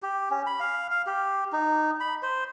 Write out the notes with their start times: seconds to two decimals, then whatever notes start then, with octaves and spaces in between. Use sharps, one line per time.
0.02 G4
0.31 C#4
0.46 B5
0.60 F5
0.91 F5
1.07 G4
1.52 D#4
2.00 B5
2.23 C5